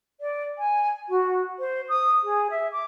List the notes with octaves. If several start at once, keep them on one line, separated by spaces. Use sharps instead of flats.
D5
G#5
F#4
C5
D#6
G#4
E5
D6